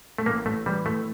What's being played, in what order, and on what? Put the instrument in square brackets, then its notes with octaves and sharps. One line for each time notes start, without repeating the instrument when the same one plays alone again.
[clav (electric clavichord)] A3
[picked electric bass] A1 [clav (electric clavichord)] A#3
[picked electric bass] A1 [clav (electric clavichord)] A3
[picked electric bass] E3 [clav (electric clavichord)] G3
[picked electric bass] A2 [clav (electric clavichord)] A3